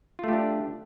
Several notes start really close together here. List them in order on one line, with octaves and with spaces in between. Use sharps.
F4 A3 G4 D4